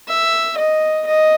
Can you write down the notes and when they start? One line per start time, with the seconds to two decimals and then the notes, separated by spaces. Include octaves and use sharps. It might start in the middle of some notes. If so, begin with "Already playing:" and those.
0.08 E5
0.57 D#5
1.07 D#5